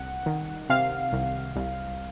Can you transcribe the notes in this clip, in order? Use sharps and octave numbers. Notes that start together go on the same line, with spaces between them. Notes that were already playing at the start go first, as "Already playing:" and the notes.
Already playing: C2 F#5
D#3
C3 F5
C2
C2